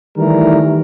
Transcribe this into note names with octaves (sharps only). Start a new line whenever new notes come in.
D#3 E3 G3 A3 A#4